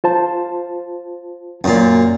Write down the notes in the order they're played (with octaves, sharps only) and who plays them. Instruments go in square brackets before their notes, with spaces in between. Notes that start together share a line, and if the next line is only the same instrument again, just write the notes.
[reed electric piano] F4 C5 A5
[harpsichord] F#2 A#2